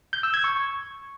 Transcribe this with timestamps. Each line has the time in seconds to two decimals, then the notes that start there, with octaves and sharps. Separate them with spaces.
0.13 G6
0.23 E6
0.34 G#6
0.44 C#6